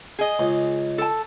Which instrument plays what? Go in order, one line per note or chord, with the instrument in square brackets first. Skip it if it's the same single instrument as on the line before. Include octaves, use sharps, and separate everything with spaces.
[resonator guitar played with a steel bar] G#4 D#5
[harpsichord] C#2
[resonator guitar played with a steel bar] A4 A5